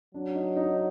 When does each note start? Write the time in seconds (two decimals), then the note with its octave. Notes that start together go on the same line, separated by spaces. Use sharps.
0.14 F#3 D4
0.35 D#4
0.56 D#4